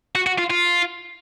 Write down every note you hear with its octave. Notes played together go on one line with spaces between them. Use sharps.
F#4
F#4
F4
F4